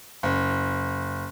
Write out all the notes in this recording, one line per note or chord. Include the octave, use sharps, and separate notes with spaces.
F#1